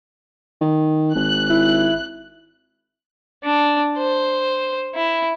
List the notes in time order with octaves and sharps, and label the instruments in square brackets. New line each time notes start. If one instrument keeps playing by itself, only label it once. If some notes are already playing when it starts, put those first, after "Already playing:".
[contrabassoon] D#3
[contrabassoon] G#1 [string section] F#6
[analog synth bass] E4
[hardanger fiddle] D4
C5
E4